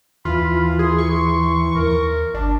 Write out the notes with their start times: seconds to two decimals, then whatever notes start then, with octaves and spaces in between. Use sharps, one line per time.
0.25 D#2 E3 F4 B5
0.79 G#4 C6
0.98 C#6
1.76 D#2 A#4
2.34 G1 D4